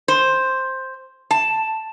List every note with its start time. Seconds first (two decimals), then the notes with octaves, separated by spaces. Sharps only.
0.08 C5
1.31 A5